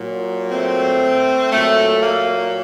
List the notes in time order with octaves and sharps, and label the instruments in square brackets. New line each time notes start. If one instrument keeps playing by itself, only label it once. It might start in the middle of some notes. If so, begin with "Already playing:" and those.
Already playing: [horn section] A#2 F#3
A3 C4
A#2 F#3 A3
A#3